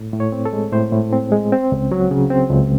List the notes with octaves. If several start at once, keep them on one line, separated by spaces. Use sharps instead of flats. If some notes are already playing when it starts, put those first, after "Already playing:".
Already playing: A2
A2
C#5
C4
A4
G#3
A2 C5
A2
C4
G#3
C4
C#2
F#3
C#3
C4
C#2